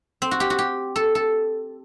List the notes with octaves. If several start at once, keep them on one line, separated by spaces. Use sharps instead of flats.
C4
F#4
G4
F#4
G4
A4
A4